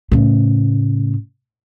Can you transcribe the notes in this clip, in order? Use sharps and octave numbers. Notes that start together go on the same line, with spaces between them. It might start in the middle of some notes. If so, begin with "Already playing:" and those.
A2 C#3